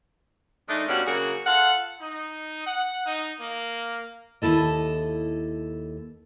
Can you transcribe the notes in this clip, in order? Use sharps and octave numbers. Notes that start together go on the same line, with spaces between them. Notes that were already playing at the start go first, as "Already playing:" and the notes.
D#3 G#3 A3 D4 D#4
B2 G3 A#3 C#4 D4 F#4
C#3 F#3 A#3 F#4 G#4 A#4
F4 A4 F5 F#5
D#4
F#5
D#4
A#3
D#2 A#2 E4 A4 D#5